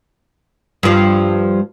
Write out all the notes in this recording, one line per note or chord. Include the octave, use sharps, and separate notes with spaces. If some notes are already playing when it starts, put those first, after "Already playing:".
G2 F3